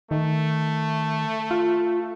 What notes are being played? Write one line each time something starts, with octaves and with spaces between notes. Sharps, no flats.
D#3 A3
F4